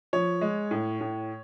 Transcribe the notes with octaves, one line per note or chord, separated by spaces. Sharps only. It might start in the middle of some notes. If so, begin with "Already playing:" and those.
F3 C#5
G#3
A2
A2